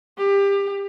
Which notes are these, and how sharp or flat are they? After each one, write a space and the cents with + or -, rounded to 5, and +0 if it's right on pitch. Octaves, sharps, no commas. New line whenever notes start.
G4 +25